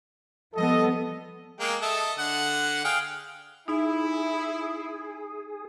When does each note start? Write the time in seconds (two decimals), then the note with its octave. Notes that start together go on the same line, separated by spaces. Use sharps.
0.55 F3 G3 B3 A4 D#5
1.60 G#3 A#3 G5
1.82 A4 D#5 E5
2.19 D3 F#5
2.84 G#4 F5 G5
3.68 D#4 E4 G#4